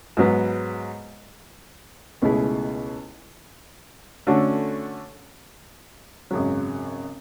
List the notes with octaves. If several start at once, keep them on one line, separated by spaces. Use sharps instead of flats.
G#2 F#3 B3
C#2 B2 A3 E4 G#4
D3 A3 C#4 F#4
G#1 F#2 C#3 F#3